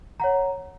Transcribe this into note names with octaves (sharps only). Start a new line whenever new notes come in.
C#5 F#5 A#5